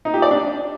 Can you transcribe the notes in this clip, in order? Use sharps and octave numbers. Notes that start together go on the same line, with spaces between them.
D#4
G4
D5
D4